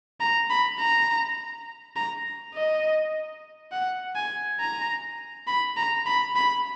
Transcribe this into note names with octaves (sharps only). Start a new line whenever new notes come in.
A#5
B5
A#5
A#5
D#5
F#5
G#5
A#5
B5
A#5
B5
B5